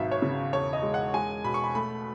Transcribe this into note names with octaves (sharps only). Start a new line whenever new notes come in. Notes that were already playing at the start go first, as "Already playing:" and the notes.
Already playing: G#1 B2 F#3 E5
C#5
C#3
E1 C#5
D#5
G#3
F#5
G#3 G#5
B2 B5
C#6
B5
A3 B5